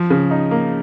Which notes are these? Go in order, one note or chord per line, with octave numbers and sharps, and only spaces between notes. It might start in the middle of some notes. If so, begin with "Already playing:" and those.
Already playing: F3
C#3
D#4
A#3